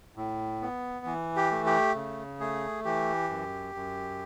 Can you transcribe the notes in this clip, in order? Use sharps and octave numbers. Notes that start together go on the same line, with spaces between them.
A2
B3
E3
G4
A3
G4
C#3
A3 G#4
E3 G4
F#2
F#2